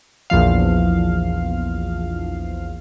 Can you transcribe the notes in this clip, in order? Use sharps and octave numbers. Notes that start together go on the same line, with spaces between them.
A#1 E2 F3 F5